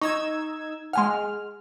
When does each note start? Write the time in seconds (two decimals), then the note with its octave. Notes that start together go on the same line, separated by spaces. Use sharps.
0.01 D#4 C#6 E6 G#6
0.93 G#3 F#5 G#5 C6 F6